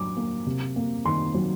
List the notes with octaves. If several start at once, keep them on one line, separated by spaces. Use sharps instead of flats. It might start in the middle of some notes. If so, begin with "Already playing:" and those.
Already playing: A2 F#3 D4 D6
A#3
C3
A#3
D#3 C6
F#3